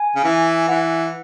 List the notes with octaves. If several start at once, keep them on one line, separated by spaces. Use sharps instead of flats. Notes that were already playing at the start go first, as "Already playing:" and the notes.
Already playing: G#5
C#3
E3
E3 F#5